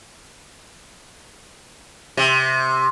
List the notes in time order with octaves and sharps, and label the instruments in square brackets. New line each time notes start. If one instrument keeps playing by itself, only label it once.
[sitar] C3